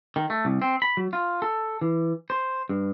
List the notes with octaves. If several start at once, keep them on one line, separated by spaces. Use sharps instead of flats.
D#3
A3
C2
C4
B5
F#3
F4
A4
E3
C5
G2